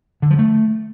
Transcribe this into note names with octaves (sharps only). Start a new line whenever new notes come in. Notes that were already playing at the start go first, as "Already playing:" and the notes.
D3
F3
A3